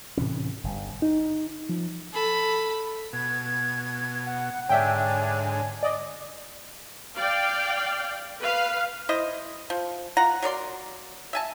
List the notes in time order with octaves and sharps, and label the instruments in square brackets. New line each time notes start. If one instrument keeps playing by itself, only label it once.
[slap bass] A2 C3 E3 C#4
G1 G2
[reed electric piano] D#4
F3
[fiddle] A4 B5
[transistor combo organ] B2 [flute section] G#6
[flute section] F#5
[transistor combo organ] G#2 D3 [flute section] D4 C#5 G#5 [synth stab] E5 G5
[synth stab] D5 D#5
[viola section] D5 F5 G5
B4 F5
[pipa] E4 C5 D#5
F3
F4 F#5 A#5
F#3 A#4 D5 C6
E5 G#5 A5